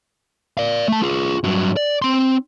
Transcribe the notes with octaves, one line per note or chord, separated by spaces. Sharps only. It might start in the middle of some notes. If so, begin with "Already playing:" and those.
D5 F5
A3 A5
F4 G#4
G2 F#3
D5
C4 C6